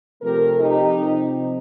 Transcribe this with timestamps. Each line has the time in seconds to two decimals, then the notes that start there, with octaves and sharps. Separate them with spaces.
0.22 C3 F3 A3 C4 G4 A#4
0.60 D#4 G4
0.97 C3 F3 C4